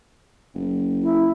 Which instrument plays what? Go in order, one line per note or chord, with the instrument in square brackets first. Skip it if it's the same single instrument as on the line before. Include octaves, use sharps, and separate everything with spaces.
[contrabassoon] F#1
[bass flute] E4